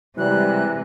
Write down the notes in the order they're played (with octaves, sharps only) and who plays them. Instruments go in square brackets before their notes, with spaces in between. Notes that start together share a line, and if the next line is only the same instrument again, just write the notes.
[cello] C3 G#3 [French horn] E3 [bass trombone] G3 [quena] F#6